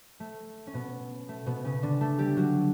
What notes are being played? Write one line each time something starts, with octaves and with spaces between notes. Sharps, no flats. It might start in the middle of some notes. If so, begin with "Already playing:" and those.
A3
C#4
B2 B3
A3
B2 B3
C#3 C#4
D3 D4
A3 A4
G3 G4
F#3 F#4